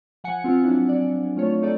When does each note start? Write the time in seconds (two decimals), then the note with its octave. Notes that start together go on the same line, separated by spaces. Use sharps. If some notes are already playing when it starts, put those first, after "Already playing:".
0.24 F3 F#5 G#5 C#7
0.44 C4 F4
0.64 F#3 D4 E4
0.89 D5
1.37 A3 F4 C#5
1.63 D#4 A4 D5